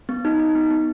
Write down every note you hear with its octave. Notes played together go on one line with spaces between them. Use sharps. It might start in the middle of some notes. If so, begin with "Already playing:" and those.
B3
D#4
D#4
B3
B3